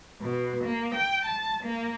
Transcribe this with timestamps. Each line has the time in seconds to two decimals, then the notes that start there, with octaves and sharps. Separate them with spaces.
0.20 B2
0.65 A#3
0.95 G5
1.25 A5
1.64 A#3